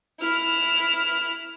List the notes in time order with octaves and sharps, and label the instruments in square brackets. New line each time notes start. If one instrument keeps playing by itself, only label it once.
[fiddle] E4 F6